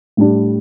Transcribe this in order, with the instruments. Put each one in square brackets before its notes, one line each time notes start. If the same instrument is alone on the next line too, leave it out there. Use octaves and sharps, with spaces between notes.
[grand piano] A2 G3 D4